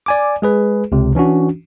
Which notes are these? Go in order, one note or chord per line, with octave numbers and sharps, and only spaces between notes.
D5 G#5 D6
G#3 G#4 B4
C#2 C3
E3 C#4 D4 F#4